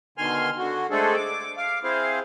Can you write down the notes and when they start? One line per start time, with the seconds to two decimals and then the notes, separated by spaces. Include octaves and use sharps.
0.18 B2 D3 D#3 G#5 C6 F6
0.58 D3 F#4
0.90 G#3 A3 C4 D4 G#4 A4
1.16 D6
1.57 F5 D6
1.83 C4 E4 G#4 C5 F5